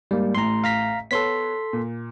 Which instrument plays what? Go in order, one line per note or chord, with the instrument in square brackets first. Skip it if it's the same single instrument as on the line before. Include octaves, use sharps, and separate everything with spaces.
[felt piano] G#2 [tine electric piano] G3 A#3
[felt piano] A1 A2 [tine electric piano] A#5 C6
[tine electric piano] F5 A#5 B6
[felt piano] B3 C#5 [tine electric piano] A4 C6 B6
[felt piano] A#2